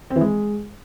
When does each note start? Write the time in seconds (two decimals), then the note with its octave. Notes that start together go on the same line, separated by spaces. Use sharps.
0.10 C4
0.16 E3
0.21 G#3